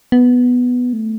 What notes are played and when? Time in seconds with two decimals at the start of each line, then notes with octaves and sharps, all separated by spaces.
0.12 B3
0.93 A3